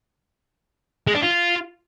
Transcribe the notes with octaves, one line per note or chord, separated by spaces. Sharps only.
G#3
D4
F4